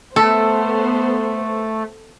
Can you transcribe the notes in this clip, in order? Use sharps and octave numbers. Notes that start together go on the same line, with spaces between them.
A3 B3 A4 C5